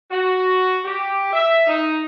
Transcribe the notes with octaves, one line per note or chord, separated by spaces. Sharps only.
F#4
G4
E5
D#4